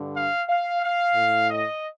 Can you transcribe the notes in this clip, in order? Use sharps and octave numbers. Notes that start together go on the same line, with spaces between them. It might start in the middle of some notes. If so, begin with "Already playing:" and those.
Already playing: G2 D3
F5
F5
F5
A2
D#5